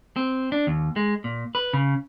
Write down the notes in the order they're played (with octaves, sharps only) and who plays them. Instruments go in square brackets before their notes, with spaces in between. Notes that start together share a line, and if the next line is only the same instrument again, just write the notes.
[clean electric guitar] C4
D4
D#2
G#3
A#2
B4
C#3